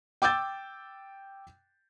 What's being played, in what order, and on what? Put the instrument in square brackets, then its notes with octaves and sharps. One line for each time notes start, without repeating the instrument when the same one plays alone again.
[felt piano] G5 D6 E6 G6 A6